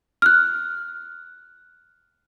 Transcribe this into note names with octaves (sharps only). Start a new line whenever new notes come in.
F6 F#6